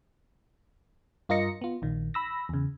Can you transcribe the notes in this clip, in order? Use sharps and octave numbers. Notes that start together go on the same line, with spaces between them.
G2 F4 A#4 D#5 A#6 C#7
B3 F4
A#1 D#3
B5 E6 A#6
E2 C#3